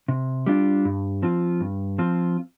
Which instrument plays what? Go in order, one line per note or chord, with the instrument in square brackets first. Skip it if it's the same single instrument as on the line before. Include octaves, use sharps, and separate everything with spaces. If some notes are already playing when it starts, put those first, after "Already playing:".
[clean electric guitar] C3
G3 D4 F4
G2
F3 C4 F4
G2
F3 C4 F4